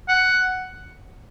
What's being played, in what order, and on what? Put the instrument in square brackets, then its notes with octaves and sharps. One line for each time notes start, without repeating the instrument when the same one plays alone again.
[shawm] F#5